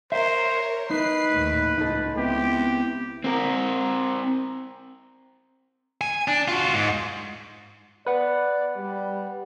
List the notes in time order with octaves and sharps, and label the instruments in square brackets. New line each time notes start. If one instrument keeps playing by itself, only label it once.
[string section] A#4 C#5 [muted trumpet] C5 [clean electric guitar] E5
[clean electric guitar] D#4 [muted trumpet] B4 [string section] C7
[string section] A#1 D#2 A2
[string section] C#2 [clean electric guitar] D#4 A4
[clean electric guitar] B3 C4 E4 [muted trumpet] G4
[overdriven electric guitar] C4 A#4
[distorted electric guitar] G#5
D4
F4 F#4
G#2
[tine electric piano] B4 F#5 [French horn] D5
[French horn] G3